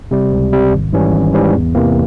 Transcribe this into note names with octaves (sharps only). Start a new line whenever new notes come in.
C3 G3
C#2
C3 G3
G#1
G#2 E3 G3 C#4
G#1
G#2 E3 G3 C#4
E2
C3 E3 A#3